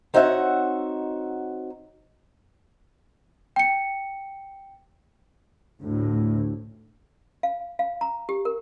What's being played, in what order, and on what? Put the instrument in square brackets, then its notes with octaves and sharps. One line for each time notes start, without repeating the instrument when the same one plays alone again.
[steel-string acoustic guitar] C4 D#4 F#4 C#5 E5 F#5
[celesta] G5 C#7
[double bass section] D2 A2
[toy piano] F5
F5
A#5
G4
A#4